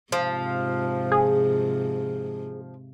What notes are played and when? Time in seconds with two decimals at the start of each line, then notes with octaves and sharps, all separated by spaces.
0.12 G#2 C3 F3
1.12 G#4